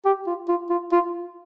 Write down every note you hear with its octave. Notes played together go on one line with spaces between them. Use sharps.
G4
F4
F4
F4
F4